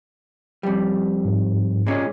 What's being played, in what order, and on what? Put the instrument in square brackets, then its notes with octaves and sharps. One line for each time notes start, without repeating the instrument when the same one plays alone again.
[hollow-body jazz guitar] F2 G3
[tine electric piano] G#2
[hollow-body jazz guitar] A#2 G#3 C#4